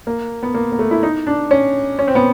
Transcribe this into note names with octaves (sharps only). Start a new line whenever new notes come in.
A#3
B3
A#3
A#3
A3
E4
D#4
D4
C#4
C#4
C4
B3